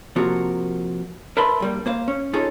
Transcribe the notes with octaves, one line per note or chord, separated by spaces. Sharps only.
C3 F3 A#3 F#4 A#4
A#4 B4 E5 A5 B5 C6
G2 G3 A#3
A#3 C5 F5
C#4
C#4 D#4 F4 G#4 A4 C#5